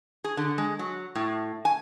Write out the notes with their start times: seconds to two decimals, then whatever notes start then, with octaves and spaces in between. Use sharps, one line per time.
0.24 G#4
0.37 D3
0.58 G#3
0.79 F#3
1.15 A2
1.65 G#5